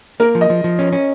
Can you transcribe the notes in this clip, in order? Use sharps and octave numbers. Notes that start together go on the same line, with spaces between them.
A#3 A#4
F3
D#5
F3
F3
C#4
C#4